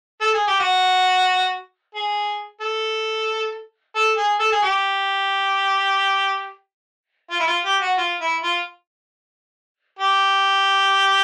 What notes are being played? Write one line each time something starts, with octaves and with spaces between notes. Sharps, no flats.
A4
G#4
G4
F#4
G#4
A4
A4
G#4
A4
G#4
G4
F4
E4
F4
G4
F#4
F4
E4
F4
G4